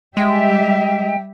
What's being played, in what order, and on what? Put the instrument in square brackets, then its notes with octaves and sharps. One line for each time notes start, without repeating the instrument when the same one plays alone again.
[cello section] G3 G4 E5 [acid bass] G#3 [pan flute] G5